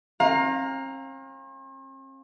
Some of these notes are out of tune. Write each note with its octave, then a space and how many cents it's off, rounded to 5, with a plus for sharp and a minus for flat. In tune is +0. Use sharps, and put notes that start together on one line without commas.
C4 +45 F5 +25 A#5 +0